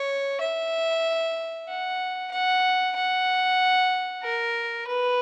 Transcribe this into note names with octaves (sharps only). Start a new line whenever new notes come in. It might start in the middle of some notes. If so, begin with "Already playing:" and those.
Already playing: C#5
E5
F#5
F#5
F#5
A#4
B4